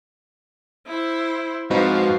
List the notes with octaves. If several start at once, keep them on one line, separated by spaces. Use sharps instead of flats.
E4 C5
G#2 F3 C4 D#4 F#4 B4 F5